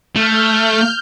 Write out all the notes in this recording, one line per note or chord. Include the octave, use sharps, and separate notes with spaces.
A3 F6 G6